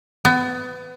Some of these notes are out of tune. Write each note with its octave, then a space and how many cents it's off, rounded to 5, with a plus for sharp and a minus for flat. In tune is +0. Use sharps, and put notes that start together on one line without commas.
B3 +25